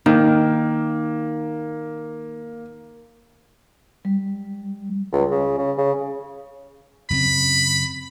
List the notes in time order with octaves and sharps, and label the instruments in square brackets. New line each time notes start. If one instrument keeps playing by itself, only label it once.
[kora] D#3 [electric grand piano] A#3
[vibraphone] G3
[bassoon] C#2
C#3
C#3
C#3
[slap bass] F#2 C#3 C4 [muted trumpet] B5